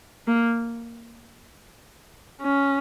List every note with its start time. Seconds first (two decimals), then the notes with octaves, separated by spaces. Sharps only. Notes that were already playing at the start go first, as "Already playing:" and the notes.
0.27 A#3
2.42 C#4